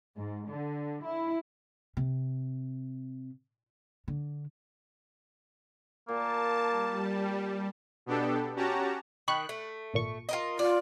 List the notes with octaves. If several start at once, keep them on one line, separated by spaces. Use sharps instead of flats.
G#2
D3
E4
C3
D3
A#2 A#3 A5
G3
B2 B3 D4 G4 A4
C#4 F#4 G4 A5 A#5
D#3 B5 C#6 F#6
A3
G#1 A#2 C#6
F4 A#4 D#5
F4 D5